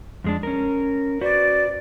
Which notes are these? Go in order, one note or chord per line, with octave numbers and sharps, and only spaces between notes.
F2 G#3 D4
C#4 A#4
F#4 B4 C5 D5